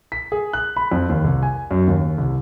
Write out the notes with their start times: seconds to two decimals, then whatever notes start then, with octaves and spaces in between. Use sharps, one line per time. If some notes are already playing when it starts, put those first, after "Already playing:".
0.12 B6
0.32 G#4
0.53 F#6
0.77 B5
0.92 F2
1.09 D#2
1.25 C2
1.43 G#5
1.71 F#2
1.87 D#2
2.18 C2